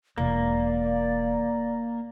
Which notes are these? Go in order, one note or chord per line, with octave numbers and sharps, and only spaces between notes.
E1 A#3 D5